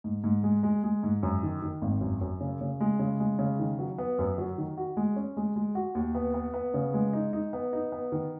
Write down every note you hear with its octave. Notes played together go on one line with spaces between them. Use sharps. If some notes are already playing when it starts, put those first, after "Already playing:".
G#2
G#2
G#3
G#3
G#3
G#2
F#2
D#3
D#3
G#1
F#2
F#2
C#3
C#3
G#3
C#3
G#3
C#3
D#3
F#3
B3
F#2
F#3
D#3
F#4
G#3
C#4
G#3
G#3
F#4
D#2
B3
B3
B3
C#3
G#3
D#4
D#4
B3
D#4
B3
D#3